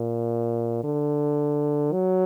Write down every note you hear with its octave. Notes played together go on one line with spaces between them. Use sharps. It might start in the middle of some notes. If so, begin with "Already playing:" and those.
Already playing: A#2
D3
F#3